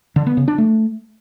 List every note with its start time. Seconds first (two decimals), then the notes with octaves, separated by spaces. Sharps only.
0.16 D3
0.27 B3
0.37 C#3
0.48 D4
0.58 A3